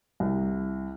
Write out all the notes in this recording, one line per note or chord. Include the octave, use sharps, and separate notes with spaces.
C2